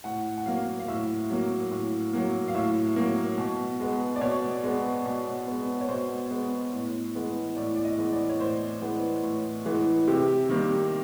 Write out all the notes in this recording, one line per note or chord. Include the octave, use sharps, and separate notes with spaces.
A2 F#5
F#5
F#3 A#3 F5
F5
A2 E5
F#3 A#3
A2
F#3 A#3
F5
A2 E5
F#3 A#3
B2
G#3 B3
D5
B2 C#5
G#3 B3
B2
G#3 B3
C#5
B2 C5
G#3 B3
A2
E3 G#3 B3
A2 D5
D5
D#5
E3 G#3 B3
D5
C#5
A2 C5
E3 G#3 B3
A2
E3 G#3 B3
C3 G4
D#3 G3 A#3